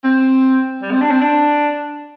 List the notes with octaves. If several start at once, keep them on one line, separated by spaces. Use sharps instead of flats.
C4
G3
C4
D4
C4
D4